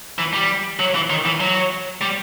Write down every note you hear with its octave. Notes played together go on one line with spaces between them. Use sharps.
E3
G3
F#3
E3
D#3
E3
F#3
G3